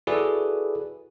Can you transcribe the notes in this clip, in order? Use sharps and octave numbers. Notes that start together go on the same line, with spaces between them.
E4 F#4 G#4 A4 B4 D5